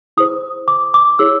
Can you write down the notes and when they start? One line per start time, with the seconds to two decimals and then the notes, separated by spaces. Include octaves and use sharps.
0.17 E4 G#4 C5 D#6
0.68 D6
0.94 D6
1.19 E4 G#4 C#5 E6